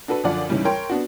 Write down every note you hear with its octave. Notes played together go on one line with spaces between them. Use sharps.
D4 F#4 A4 B4
F#2 D3 F3 F4 D5 F#5
C#2 G#2 E3 G3 C#4
A#4 C#5 G5 C6
B3 D4 F#4